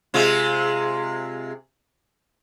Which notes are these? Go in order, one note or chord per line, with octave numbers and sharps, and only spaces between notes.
C3 G#3 F4